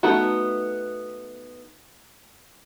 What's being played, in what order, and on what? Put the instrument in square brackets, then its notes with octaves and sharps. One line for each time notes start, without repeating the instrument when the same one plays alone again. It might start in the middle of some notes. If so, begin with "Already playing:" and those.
[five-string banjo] A3 B3 D#4 F#4